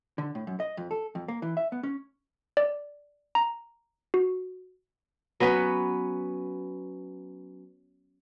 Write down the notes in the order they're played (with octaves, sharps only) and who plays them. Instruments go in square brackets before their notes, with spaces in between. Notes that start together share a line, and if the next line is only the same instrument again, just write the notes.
[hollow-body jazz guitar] D3
A2
F#2
D#5
F2
A4
F2
A#3
E3
E5
B3
C#4
[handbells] D5
A#5
F#4
[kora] F#3 B3 C#4 B4